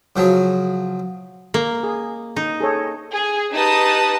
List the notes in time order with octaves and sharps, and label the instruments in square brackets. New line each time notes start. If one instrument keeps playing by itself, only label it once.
[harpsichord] C#3 F3 F#3
[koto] A#3
[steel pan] G#4
[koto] D#4
[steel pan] G#4 A4 C#5
[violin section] G#4
D#4 G4 B4 A5 D#6